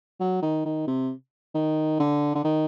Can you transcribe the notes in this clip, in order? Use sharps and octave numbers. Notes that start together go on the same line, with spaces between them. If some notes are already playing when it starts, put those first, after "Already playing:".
F#3
D#3
D#3
C3
D#3
D3
D3
D#3